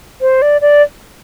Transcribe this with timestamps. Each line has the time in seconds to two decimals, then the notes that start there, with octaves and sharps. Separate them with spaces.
0.21 C5
0.42 D5
0.61 D5